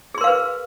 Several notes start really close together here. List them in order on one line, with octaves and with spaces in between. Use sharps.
G#4 C6 A#4 F5 B4